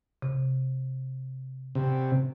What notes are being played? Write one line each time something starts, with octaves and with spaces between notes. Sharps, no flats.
C3
C3